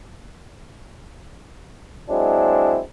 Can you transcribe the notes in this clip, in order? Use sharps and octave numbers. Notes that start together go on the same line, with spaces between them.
F#3 G#3 C4 D4 E4